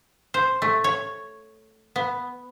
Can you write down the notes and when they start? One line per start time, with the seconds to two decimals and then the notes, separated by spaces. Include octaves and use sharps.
0.34 C5
0.62 A3
0.84 C#5
1.96 B3